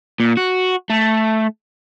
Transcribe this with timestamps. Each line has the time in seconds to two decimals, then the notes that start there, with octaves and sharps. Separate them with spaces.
0.20 A#2
0.37 F#4
0.90 A3